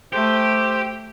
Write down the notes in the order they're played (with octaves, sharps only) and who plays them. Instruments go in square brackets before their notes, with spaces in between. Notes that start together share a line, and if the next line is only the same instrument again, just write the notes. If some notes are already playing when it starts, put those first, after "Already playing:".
[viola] A3 [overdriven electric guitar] G4 [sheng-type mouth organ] C5